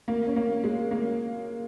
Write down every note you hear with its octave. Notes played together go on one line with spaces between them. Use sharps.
A#3
C#4
A#3
G#3
A#3